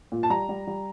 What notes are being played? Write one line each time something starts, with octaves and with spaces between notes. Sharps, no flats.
A#2
A5
G3 A#5
G3
G3